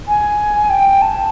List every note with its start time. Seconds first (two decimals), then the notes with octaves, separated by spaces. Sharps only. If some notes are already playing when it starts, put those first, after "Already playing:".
0.08 G#5
0.70 G5
1.02 A5